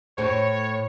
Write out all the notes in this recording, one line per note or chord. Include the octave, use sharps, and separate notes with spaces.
A2 C5 C#5